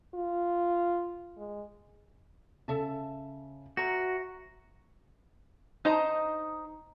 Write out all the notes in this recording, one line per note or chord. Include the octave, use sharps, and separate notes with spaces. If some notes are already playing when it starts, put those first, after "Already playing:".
F4
G#3
C#3 A4 E5 A5
F#4 C5 E5 A#5 A#6
D#4 C5 D#5 A#5